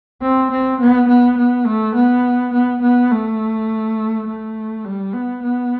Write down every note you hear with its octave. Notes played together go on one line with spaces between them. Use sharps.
C4
C4
B3
B3
B3
A3
B3
B3
B3
A3
A3
G3
B3
B3